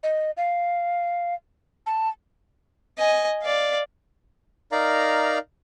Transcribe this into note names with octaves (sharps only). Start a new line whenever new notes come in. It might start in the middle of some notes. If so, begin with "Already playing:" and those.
D#5
F5
A5
D#5 G#5
D5 F5
D#4 A#4 D5 F5 A#5